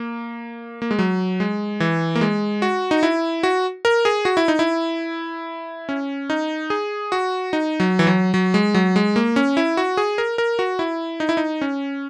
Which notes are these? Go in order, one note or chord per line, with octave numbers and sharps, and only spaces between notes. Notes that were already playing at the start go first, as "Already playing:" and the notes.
Already playing: A#3
A#3
G#3
F#3
G#3
E3
A#3
G#3
F#4
D#4
E4
F#4
A#4
G#4
F#4
E4
D#4
E4
C#4
D#4
G#4
F#4
D#4
F#3
E3
F#3
F#3
G#3
F#3
G#3
A#3
C#4
E4
F#4
G#4
A#4
A#4
F#4
E4
D#4
E4
D#4
C#4